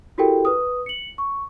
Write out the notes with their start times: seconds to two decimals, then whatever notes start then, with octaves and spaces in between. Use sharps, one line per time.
0.18 E4 F#4 G4 A4 A#4 G5
0.45 B4 D#6
0.86 C#7 F#7
1.18 C#6